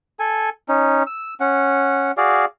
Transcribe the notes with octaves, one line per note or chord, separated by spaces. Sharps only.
A4 G#5
C#4 D#4
E6
C#4 F#5
F#4 G#4 D5 F5